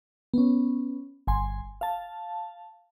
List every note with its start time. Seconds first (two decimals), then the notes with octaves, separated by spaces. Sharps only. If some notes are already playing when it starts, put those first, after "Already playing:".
0.34 B3 C#4
1.27 G1 G#5 C6
1.81 F5 A5